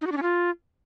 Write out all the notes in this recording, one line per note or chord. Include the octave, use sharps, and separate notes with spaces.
D#4
F#4
D4
C#4
F4